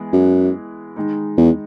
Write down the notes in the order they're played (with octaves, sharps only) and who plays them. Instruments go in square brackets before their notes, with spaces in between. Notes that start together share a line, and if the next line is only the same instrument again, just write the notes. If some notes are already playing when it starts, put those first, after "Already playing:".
Already playing: [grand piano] E3 G#3 B3 G#4
[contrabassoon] F#2
[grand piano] D#3 G#3 D#4
[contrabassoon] E2